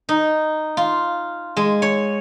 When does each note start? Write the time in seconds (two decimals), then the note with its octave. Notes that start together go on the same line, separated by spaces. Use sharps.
0.09 D#4
0.77 F4
1.57 G#3
1.82 C#5